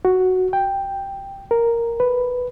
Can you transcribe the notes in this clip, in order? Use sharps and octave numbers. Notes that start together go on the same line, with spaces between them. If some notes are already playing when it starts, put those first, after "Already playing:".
F#4
G5
A#4
B4